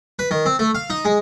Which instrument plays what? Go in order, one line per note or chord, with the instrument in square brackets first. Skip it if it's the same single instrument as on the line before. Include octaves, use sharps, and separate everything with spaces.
[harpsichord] B4
D#3
C4
A3
F5
D#4
G#3